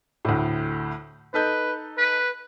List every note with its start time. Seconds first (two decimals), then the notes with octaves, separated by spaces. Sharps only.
0.25 D2 A2
1.34 D#4 A4 B4 G6
1.98 B4